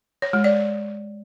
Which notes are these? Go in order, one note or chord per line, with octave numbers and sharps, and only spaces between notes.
C#5
G#3
D5